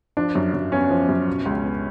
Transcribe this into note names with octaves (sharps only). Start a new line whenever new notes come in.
F3 D4
F#2
F#2
B3 C#4
F3
F#2
B2
C#2
B3